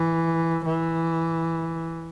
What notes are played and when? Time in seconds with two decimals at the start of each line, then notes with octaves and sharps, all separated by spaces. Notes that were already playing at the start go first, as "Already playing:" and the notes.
Already playing: E3
0.65 E3